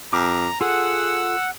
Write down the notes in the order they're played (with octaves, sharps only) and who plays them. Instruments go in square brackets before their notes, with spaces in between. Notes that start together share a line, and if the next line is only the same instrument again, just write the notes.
[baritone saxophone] F2 [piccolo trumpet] A#5 [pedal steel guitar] D6
[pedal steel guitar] F4 A4 [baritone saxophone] G#4 [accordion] F#5 [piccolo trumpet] E6